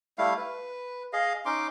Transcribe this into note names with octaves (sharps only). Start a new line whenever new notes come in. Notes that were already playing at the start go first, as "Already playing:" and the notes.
G3 A3 E4 F5
B4
G#4 D#5 F5
C#4 D#4 C6 D6